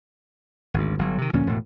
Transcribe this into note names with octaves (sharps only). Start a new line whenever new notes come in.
G#1 D2
G1 F#3
C3 D#3
D2 A#2 F3 C#4
E1 A2